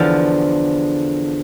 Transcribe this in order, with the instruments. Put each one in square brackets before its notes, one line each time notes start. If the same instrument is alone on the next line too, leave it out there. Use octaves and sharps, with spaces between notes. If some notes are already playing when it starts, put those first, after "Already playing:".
Already playing: [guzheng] E2 D3 F3 F5